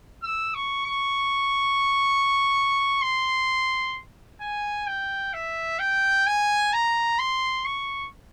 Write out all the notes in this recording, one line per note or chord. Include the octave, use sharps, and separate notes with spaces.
E6
C#6
C#6
C6
G#5
G5
E5
G5
G#5
A#5
C6
C#6